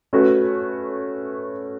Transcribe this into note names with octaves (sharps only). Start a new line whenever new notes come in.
A3 C#4 F#4 B4